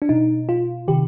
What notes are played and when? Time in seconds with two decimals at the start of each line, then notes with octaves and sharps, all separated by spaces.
0.02 D4
0.09 B2 D#4
0.49 F4
0.88 C3 D#3 G4